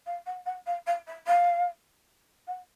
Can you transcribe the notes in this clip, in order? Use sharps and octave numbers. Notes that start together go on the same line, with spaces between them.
F5
F#5
F#5
F5
F5
E5
F5
F#5